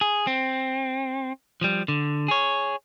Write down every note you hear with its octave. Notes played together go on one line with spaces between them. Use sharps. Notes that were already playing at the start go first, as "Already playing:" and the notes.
G#4
C4
F3 G3
D3
G#4 C#5